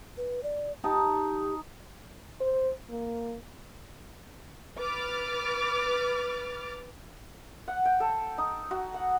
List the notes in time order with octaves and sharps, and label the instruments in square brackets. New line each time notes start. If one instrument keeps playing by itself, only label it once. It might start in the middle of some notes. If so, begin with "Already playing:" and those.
[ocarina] B4
D5
[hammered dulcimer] D#4 G5 A5 [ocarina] G4
[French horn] C5
A#3
[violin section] B4 D6 F6 A6
[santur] F#5
G5
A4
D#4
F#4
F#5